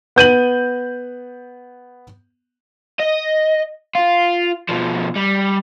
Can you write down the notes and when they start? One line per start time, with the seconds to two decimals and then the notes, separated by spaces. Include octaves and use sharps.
0.16 B3 G6 D#7 F#7
2.99 D#5
3.95 F4
4.69 B2 F3
5.17 G3